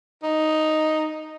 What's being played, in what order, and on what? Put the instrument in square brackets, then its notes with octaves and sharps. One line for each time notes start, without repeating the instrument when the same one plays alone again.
[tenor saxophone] D#4